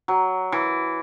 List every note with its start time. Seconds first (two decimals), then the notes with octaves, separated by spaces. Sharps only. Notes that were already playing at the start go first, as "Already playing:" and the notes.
0.08 F#3
0.52 E3